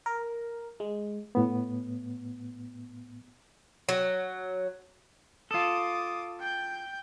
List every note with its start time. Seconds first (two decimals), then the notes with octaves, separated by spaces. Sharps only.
0.06 A#4
0.80 G#3
1.35 A2 B3
3.89 F#3
5.51 F4 A4 D6 D#6
6.40 G5 G6